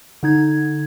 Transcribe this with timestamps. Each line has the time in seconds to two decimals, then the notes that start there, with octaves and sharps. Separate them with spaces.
0.23 D3 D#4 G#6